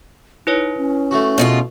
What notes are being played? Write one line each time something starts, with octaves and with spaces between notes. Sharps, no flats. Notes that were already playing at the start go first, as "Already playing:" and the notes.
D#4 E4 B4 C#5
C#4
A3 F#4
B2 G#3 F4